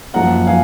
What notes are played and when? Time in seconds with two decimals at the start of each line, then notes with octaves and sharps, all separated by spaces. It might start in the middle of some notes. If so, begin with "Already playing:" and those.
0.14 F#2 F3 A#3 F#5 A#5
0.47 F3 F5 G#5